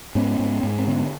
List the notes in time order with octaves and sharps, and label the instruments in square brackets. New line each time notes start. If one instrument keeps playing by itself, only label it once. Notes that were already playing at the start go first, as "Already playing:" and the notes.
[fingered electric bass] G#2 B3 C#4
G#2
G#2
C4
D3 B3 C#4